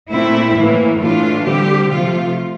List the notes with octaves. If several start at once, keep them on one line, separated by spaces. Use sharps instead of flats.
A#2 A3 C4 E4
A2 E3 A#3
A2 E3 A3 D4 F4
D3 G3 C4 G4
C3 F3 A3 F4